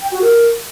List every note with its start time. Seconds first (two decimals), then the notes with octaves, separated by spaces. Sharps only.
0.01 G5
0.11 F#4
0.22 A#4